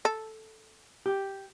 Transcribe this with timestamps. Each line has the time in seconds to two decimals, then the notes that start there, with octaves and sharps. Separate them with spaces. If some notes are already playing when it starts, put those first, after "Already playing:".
0.05 A4
1.06 G4